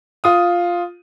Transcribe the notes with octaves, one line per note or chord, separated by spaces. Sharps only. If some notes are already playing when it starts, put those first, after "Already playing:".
F4 D#6